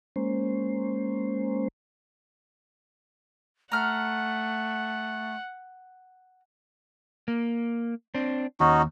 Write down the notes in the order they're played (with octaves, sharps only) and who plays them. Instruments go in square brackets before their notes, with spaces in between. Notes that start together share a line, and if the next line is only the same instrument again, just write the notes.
[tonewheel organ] G#3 A#3 C#4 C5
[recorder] A3 [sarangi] F#5 [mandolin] A#5 F6
[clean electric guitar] A#3
C4 D4
[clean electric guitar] D#2 [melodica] C#4 D#4 F#4